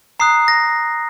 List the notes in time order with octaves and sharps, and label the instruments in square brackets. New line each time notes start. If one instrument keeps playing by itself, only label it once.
[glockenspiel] A#5 D#6 F#6 C7
A#6